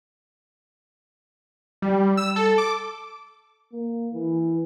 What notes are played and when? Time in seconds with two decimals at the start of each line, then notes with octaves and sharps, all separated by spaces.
1.82 G3
2.17 E6
2.36 A4
2.58 D6
3.73 A#3
4.14 E3